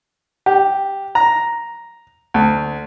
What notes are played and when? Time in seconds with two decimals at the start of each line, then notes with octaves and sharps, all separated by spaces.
0.46 G4
1.15 A#5
2.34 D2